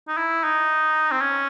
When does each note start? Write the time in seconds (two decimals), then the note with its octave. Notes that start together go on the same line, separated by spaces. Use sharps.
0.08 D#4
0.17 E4
0.44 D#4
1.12 C4
1.21 C#4